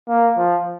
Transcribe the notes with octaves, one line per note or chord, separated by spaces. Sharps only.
A#3
F3